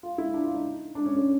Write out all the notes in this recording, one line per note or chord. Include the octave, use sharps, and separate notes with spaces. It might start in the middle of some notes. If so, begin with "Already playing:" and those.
F4
E4
D4
F4
D#4
D4
C#4
C#4